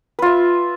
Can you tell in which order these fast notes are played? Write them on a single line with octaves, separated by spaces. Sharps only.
B4 F4 E5